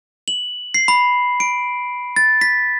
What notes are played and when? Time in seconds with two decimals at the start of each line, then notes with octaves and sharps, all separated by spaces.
0.28 F#7
0.74 C7
0.88 B5
1.40 D7
2.16 A6
2.41 B6